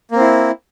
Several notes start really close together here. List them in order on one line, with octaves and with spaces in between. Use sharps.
A#3 C4 E4